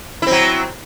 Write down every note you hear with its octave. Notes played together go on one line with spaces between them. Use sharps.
F#3 C4 E4